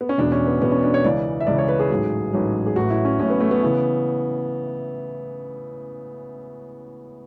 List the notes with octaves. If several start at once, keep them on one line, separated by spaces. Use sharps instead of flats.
B3
C#4
E1 E2 B2 D4
C#4
B3
E1 E2 B2 B3
C#4
D4
C#5
C#2 C#3 E3 D5
E5
C#2 C#3 E3 D5
C#5
B4
G#4
A1 G#2 F#3
A1 G#2 F#3
G#4
A1 A2 F#3 F#4
E4
C#4
A1 A2 F#3 C#4
B3
A3
B3
C#3 E3